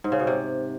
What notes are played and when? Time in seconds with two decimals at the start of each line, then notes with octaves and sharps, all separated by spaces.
0.04 G#2
0.12 C#3
0.20 B2
0.27 C3